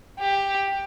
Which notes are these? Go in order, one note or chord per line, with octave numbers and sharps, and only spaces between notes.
G4